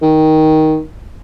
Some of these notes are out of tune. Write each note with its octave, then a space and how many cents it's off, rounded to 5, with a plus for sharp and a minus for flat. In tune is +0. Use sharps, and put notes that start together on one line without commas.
D#3 +10